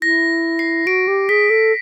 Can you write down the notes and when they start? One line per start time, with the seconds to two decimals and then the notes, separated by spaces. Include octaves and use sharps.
0.02 E4 A#6
0.59 C7
0.86 F#4 D7
1.08 G4
1.29 G#4 B6
1.50 A4